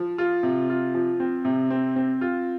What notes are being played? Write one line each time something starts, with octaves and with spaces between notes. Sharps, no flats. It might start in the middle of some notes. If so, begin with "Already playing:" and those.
Already playing: F3
F4
C3
F4
F3
C4
C3
C4
C4
F4